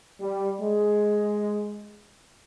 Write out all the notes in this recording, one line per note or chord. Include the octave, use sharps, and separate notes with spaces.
G3
G#3